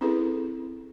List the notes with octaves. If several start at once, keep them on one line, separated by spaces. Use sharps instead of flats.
C4 C#4 E4 G#4 A4 B4